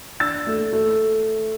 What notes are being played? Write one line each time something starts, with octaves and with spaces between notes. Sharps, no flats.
D4 E6 A6
A3
A3